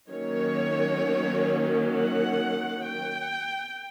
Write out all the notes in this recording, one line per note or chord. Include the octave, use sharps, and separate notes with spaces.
D#3 F#3 A#3 C#4 C#5
F#5
G5